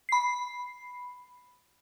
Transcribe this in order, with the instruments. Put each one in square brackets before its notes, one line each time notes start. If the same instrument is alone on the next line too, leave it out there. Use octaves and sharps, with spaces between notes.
[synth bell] B5 C7